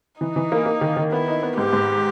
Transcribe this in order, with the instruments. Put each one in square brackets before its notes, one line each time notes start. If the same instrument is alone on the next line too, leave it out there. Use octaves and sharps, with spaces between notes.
[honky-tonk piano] E3 [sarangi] D#4
[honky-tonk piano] E3
A#3
A#3
D#3
D#3
[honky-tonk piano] B3 [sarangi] E4
[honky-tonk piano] D#4
B3
[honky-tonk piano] G#2 [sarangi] G4
[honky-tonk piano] G#2